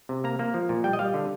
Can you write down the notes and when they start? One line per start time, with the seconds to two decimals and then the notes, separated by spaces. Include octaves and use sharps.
0.09 C3
0.24 A#3 A#5
0.39 A#3
0.54 F3
0.69 A#2
0.84 G3 G5
0.93 D#5
0.99 G3 F5
1.14 D3